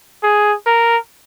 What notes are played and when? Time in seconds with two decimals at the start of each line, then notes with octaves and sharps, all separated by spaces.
0.23 G#4
0.66 A#4